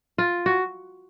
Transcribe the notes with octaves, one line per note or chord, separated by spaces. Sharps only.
F4
F#4